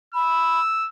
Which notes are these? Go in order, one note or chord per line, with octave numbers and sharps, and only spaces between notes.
B5 E6